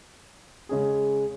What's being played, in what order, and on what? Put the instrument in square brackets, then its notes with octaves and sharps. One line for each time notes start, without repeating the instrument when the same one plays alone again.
[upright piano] C#3 G#3 C#4 G#4